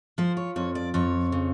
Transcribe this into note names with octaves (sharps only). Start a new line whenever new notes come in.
F3 C5
C#5
F2 C#5
D5
F2 C#5
C#3